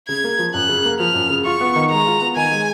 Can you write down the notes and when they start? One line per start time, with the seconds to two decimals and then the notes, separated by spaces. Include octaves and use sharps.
0.08 C#3 G#6
0.24 A#3
0.39 F3
0.54 F#2 F#6
0.69 C#3
0.85 A#3
1.00 F3 F6
1.15 F#2
1.30 C#3
1.45 F4 C#6
1.61 B3
1.76 D#3
1.91 G#3 A#5
2.07 F4
2.21 B3
2.36 D#3 G#5
2.52 G#3